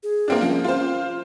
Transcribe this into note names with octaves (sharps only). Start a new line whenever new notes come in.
G#4
A#3 C4 D4
F3 C#4
F4 C5